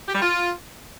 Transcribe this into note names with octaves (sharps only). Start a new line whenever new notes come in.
G4
G3
F4